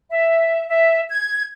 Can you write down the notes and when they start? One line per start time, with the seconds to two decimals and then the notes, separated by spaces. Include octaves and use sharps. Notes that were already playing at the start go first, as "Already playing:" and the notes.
0.10 E5
0.68 E5
1.10 G#6